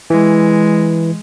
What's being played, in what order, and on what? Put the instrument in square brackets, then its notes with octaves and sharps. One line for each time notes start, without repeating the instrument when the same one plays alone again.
[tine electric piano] E3 [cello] G#3